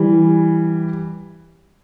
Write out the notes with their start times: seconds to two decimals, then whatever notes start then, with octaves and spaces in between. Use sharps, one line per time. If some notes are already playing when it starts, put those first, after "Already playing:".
Already playing: E3 G3